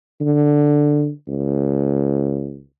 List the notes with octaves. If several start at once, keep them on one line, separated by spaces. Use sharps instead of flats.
D3
C#2